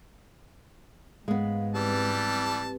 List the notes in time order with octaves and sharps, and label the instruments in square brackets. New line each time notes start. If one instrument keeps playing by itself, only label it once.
[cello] G#2 [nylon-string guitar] G#3 B3 [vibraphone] F5
[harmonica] E3 G3 A5 [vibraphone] C4 G4 B4